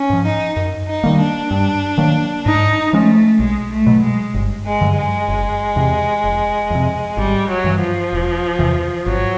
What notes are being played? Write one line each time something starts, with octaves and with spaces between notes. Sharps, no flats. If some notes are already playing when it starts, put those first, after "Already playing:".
Already playing: C#4
G#2 F3
D#4
F#2
D#4
D#3 G3 A#3
D4
G2
D#3 F#3 A#3
G#2 D#4
F3 G#3 A3 C#4
B1 G#3
A3
B2 F#3
G#3
G1
G#3
G2 D3 F#3
G#3
F#1
E2 C3
F1
F2 C3
G#1 G3
F#3
G2 E3
F3
E1
E2 C3 E3
G#1 F#3